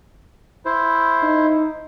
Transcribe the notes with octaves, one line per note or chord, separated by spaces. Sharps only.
E4 C5
D#4